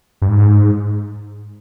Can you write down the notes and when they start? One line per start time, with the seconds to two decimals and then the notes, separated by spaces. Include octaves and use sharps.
0.22 G2
0.28 G#2